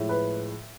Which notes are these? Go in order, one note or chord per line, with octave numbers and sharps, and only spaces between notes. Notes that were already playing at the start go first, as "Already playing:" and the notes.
Already playing: A2 F3 G#3
B4